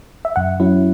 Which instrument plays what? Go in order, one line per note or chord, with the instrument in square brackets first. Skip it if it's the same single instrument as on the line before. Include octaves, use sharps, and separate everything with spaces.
[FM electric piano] E5
F#2 F#5
F#3 C#4 E4